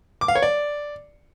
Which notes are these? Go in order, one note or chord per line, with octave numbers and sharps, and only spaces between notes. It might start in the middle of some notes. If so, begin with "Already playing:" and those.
D6
F5
C#5
D5